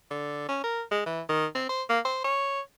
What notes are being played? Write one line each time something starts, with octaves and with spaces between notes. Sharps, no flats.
D3
C#4
A#4
G#3
E3
D#3
C4
C5
A#3
C5
C#5